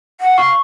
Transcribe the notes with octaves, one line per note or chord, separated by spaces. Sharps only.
F#5
F5 C#6